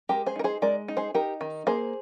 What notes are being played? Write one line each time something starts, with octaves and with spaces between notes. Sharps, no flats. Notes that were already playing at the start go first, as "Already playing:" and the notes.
G#3 G4 A#4
G#4 C5
D#4 A#4
G#4 C5
G#3 A#4 D5
D#4
G#4 C5
D#4 G4 A#4
D#3
A#3 G#4 C5